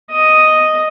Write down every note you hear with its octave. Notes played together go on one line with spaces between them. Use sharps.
D#5